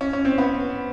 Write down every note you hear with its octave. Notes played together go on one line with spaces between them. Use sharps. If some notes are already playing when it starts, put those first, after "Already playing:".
C#4
C#4
C4
B3